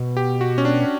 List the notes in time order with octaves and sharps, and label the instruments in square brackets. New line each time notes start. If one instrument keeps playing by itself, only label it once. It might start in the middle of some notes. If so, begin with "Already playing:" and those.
Already playing: [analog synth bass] B2
[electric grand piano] G4
F#4
C#4
D4